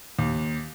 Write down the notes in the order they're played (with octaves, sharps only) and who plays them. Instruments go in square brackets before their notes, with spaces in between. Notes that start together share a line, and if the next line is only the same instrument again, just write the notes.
[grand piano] D#2